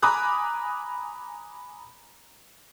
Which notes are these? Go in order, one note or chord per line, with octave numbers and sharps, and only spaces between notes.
G#5 A#5 B5 D6 D#6 F#6